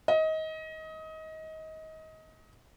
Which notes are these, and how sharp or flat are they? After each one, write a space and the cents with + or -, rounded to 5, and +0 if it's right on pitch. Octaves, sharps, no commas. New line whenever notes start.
D#5 +25